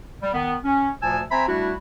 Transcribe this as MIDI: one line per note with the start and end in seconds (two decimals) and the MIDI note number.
0.22 0.34 55
0.34 0.55 51
0.34 0.55 59
0.64 0.90 61
1.02 1.21 38
1.02 1.21 46
1.02 1.21 53
1.02 1.21 80
1.02 1.21 81
1.02 1.21 88
1.31 1.47 60
1.31 1.47 72
1.31 1.47 76
1.31 1.47 80
1.31 1.47 82
1.31 1.47 83
1.48 1.72 55
1.48 1.72 57
1.48 1.72 62
1.48 1.72 64
1.48 1.72 66